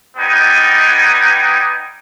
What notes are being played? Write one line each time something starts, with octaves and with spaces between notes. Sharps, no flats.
G3 B3 D#4 G5 G#5